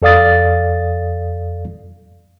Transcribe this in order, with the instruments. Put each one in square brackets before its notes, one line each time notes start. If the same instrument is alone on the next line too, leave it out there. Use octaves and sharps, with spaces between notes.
[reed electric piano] F2 A4 D5 F5 D#6 A6